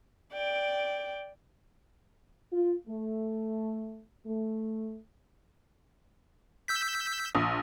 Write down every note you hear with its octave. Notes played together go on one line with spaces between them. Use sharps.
D5 G5
F4
A3
A3
E6 G6 B6
A#1 D#6